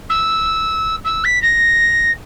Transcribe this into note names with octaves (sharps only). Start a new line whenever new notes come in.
E6
E6
B6
A#6